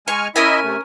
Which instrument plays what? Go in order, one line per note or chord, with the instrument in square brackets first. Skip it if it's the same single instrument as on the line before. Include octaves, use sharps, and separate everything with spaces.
[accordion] G#3 G#5 F6 [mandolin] C#6
[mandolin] C#4 A#4 G#5 [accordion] E4 D#5 E5
[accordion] C3 A3